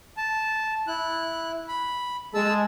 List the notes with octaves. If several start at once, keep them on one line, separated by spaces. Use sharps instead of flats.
A5
E4 F#6
B5
G#3 A5 E6